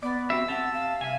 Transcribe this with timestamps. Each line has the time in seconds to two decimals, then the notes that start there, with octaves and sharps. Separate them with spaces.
0.03 B3 D5
0.30 C4 F#4 G4 E5 E6
0.48 C4 G4 E5 F#5 A5
0.73 F5
1.01 C2 C4 E5 G#5